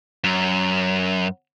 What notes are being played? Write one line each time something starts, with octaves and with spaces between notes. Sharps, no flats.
F#2